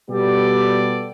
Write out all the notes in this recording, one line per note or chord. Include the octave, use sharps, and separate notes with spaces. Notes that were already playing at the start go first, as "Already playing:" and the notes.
B2 G3 B3 G4 A4 D5